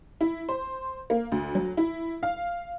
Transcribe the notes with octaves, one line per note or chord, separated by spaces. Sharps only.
E4
C5
A#3
D2
F#3
E4
F5